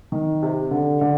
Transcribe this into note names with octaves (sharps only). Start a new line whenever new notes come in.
D#3
C3
D3
D3